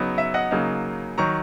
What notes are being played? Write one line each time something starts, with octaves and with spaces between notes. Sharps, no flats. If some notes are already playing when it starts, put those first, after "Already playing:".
Already playing: C#3 F#3 B3 D#4
E5
D#5 F#5
C#3 F#3 A#3 D#4
D#3 F#3 A#5 C#6